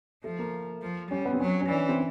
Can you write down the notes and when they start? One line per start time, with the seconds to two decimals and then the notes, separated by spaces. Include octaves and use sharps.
0.24 F3 A3
0.39 A#3
0.82 F3
1.10 G3 C#4
1.25 B3
1.33 C4
1.40 F#3 C#4
1.61 C#4
1.69 E3 D4
1.89 C4